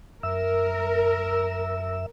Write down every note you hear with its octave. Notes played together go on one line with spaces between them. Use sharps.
F#2 A#4 E5 E6